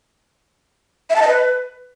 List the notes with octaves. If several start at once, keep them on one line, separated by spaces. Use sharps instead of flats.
E5
A5
D#5
B4